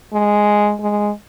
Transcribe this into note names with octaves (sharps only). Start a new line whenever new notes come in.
G#3
G#3